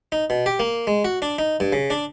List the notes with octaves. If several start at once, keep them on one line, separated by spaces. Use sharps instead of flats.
D#4
B2
G4
A#3
G#3
F#4
D4
D#4
G2
C#3
D4